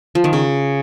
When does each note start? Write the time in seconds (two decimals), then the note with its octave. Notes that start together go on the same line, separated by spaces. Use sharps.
0.15 F3
0.24 D#3
0.33 C#3